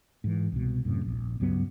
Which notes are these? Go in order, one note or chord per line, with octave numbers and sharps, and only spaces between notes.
G#2 E3
C2 B2
F#2 A2 C3
D#1 A#1
C#2 G2 F#3 B3